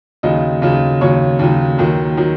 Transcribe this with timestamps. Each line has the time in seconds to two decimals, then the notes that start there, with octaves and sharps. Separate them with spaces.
0.23 D#2 C#3 F#3 D#5
0.62 D#2 C#3 F#3
1.01 D#2 C#3 F#3 C#5
1.39 D#2 C#3 F#3
1.78 D#2 D#3 F#3
2.17 D#3 F#3